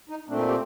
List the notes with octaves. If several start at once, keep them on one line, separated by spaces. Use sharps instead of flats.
D#4
A#2 A3 C4 D4
D#4
G4